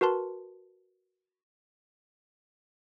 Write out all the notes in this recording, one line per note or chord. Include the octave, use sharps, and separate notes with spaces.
F#4 A#4 B4 A5 C6